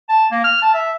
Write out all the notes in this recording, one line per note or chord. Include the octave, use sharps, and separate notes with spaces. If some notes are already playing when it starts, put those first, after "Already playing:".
A5
A#3
F6
A5
E5